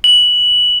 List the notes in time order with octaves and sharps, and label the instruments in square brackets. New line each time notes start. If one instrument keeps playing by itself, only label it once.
[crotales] F#7